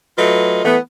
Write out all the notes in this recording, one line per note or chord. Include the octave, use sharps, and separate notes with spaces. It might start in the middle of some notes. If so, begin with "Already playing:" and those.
F#3 A3 F4 B4 D#5
E3 A3 B3